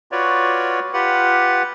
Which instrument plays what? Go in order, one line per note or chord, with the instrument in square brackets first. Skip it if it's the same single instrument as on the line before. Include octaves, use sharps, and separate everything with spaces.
[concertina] F4 F#4 B4 C#5 D5
F4 G4 B4 F#5